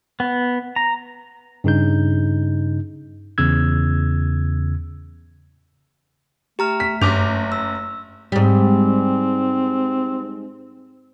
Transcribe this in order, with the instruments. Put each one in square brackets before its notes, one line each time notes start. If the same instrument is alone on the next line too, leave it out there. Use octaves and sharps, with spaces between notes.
[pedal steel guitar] B3
A#5
[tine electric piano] G2 C#3 D#4 G6
E2 C#3 E6 G#6
[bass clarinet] A3 [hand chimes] G4 A#5 F6
[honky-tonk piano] B6
[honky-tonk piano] F#1 D6 F7 [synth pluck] G2 [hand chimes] G6
[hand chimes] E6
[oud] G#2 G3 [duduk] C4